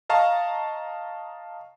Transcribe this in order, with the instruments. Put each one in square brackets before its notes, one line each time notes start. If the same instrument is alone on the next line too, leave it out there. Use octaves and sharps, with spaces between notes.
[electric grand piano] D#5 F5 A5 A#5 C#6